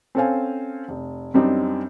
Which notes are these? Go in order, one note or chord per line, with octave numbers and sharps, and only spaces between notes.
C4 C#4 A4 C5 F5 G#5
F1
F#2 G3 C4 D4 D#4